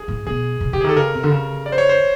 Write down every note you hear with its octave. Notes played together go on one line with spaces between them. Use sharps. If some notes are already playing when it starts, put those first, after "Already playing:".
Already playing: G#4
A2
B2 G#4
C3
C#3 G4
G#4
D#3 A4
C#3 A#4
C3
D3
C#3
D5
C5
C#5
C5